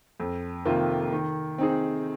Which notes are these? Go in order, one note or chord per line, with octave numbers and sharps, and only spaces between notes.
F2
C3 D#3 A#3 F4
D#3
C4 D#4 G#4